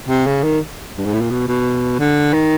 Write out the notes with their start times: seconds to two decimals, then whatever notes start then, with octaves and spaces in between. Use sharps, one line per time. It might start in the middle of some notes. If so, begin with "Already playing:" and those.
0.08 C3
0.27 C#3
0.44 D#3
0.97 G2
1.05 G#2
1.14 A2
1.22 A#2
1.30 B2
1.48 B2
1.99 D3
2.33 D#3